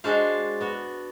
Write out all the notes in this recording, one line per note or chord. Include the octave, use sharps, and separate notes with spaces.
G#3 D4 F#4 C5 F5
B3 F#4